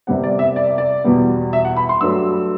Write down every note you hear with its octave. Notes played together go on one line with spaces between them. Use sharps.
C2 C3 G3 B3 F#5
D5
E5
D5
D5
E2 B2 G3 B3
E5
F#5
B5
C6
G2 F#3 A3 E6